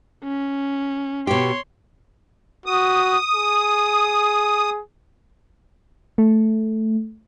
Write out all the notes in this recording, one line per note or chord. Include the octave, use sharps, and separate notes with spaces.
C#4
B2 G4 C#5 C6
F#4 D#6
G#4
A3